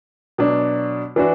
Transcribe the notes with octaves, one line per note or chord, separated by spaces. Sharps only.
B2 F#3 D4
E3 D4 F#4